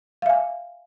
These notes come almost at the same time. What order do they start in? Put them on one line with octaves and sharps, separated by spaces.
F5 E5 G#5